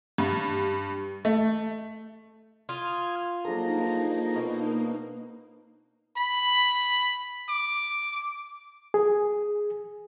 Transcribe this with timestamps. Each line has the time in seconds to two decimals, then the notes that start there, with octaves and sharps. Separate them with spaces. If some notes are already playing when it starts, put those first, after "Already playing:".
0.18 G2
1.25 A3
2.69 F4 D#6 F6 G#6
3.45 F3 F#3 A#3 D4 D#4 G#4 A4 A#5
4.35 B2 D4
6.17 B5
7.49 D6
8.94 G#4